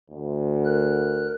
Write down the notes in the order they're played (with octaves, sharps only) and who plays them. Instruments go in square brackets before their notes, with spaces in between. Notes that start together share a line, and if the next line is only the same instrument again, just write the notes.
[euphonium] D2
[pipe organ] A#4 F#6